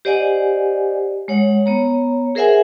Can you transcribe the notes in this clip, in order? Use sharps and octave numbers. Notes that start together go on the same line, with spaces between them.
G4 C5 D5 D#5 F#5 G#5
G#3 C#5 F#5
B3 C#5 A#5
G#4 A#4 C5 E5 F#5 G#5